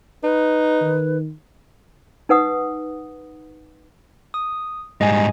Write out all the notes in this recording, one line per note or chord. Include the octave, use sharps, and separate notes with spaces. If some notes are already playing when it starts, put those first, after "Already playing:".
D#4 B4
D#3
D#4 B4 F#5 D#6
D#6
G#2 G3 D#5 G#5